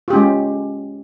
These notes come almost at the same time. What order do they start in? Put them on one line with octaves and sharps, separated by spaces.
F4 G4 C#4 G#3